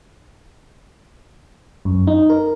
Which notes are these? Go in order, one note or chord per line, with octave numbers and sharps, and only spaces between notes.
F#2
D#4
A#4